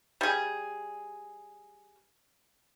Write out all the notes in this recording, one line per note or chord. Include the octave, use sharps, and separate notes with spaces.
G3 G#4